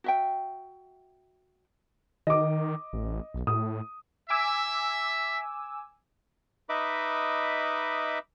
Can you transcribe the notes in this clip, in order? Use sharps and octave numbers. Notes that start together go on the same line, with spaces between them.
F#4 E5 G5
D#3 D#5 D6
A1
B1
A2 D#6
E5 G#5 D6 E6
D#4 B4 D#5 E5 B5 D6